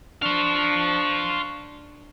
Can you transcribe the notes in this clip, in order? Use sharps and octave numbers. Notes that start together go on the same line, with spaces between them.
D4 C5 F5 C#6